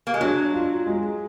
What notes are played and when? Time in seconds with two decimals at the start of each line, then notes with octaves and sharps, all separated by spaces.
0.07 A#3
0.14 G#3
0.21 F#3 D4
0.54 F4
0.87 G#3